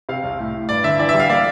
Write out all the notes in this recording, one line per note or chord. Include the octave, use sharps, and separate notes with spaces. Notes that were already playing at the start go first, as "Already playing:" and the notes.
C3 F5
C2
A2
A2
G2 D5
D3 E5
E3 D5
E5
G3 F5
A#3 D5